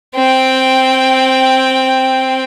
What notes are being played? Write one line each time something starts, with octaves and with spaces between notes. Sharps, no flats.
C4 G5